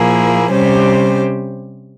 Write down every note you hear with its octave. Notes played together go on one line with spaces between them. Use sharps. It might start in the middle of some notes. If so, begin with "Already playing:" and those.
Already playing: A#2 F3 A#3 E4 G#4
C3 G3 C#4 G4 C5